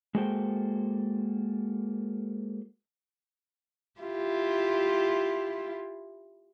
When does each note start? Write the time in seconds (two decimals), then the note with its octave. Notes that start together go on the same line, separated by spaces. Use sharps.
0.15 G#3 A#3 F#4 A4 C5 G5
4.00 E4 F4 G4